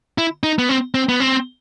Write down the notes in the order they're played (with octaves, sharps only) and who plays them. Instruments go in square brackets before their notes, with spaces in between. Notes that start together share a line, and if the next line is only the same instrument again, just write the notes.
[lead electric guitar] E4
D#4
B3
C4
C4
B3
C4